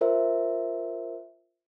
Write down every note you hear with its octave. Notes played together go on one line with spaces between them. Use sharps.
F4 A#4 C5 E5